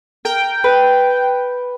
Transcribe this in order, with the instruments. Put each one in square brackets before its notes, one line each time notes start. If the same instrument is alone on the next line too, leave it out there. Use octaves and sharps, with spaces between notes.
[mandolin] A#4 [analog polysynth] G5
[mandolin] B4